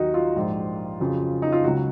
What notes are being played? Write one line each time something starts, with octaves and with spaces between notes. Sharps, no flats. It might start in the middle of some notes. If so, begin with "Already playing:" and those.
Already playing: D#2 D#3 F#3 D#4 F#4
F4
A#1 G#2 F3
F2 C#3 F#3
D#4
F4
C#2 C#3 F#3 F#4